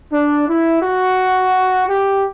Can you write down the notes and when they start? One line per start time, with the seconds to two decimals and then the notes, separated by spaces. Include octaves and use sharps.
0.12 D4
0.46 E4
0.82 F#4
1.87 G4